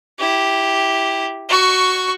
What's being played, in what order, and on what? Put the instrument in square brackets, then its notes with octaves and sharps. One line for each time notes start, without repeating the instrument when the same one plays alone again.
[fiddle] E4 G4
F#4 C#6